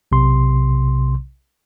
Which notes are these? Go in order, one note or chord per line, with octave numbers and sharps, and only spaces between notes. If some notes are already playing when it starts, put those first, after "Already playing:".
B1 C3 C6